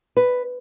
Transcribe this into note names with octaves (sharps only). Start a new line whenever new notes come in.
B4